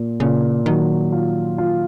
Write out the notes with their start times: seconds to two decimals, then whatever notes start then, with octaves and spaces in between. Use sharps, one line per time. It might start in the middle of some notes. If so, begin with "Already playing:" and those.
Already playing: A#2
0.20 A#2 C#3
0.66 D#3 F#3
1.12 F4
1.58 F4